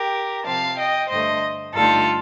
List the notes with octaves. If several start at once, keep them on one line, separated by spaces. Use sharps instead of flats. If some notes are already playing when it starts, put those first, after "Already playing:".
Already playing: G4 A#4
C3 F3 C4 F5 A5
D#5 G5
G2 D3 A3 C5 D#5
G2 D3 A3 D#4 F4 A4